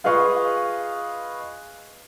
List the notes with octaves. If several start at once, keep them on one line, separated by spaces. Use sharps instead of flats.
F4 G#4 B4 D#5 F5 C#6